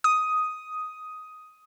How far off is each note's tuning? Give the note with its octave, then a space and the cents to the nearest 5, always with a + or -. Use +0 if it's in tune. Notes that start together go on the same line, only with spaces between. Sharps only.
D#6 +10